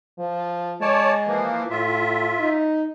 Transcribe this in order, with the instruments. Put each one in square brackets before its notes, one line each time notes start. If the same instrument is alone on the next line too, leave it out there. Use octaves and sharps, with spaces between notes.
[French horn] F3
[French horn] G#3 [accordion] C#5 D5 A5
[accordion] E3 F3 A#3
[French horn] A2 [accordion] F4 E5
[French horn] D#4